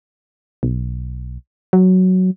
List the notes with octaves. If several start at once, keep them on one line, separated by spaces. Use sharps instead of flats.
B1
F#3